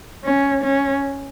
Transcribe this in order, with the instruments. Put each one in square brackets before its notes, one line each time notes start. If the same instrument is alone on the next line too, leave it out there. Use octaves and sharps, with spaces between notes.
[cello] C#4
C#4